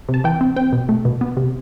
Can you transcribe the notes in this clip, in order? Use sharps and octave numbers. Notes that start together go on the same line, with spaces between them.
C3
A5
E3 G5
C4
C4 G5
B2
A3
B2
B3
C3